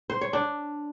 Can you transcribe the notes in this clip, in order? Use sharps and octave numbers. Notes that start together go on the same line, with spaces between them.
C5
C#5
D4